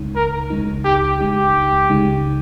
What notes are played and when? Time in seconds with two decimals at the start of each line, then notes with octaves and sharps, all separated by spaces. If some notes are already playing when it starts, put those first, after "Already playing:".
Already playing: C#2 C#3 G#3 D#4
0.15 A#4
0.50 C#2 C#3 G#3 D#4
0.84 G4
1.19 C#2 C#3 G#3 D#4 G4
1.89 C#2 C#3 G#3 D#4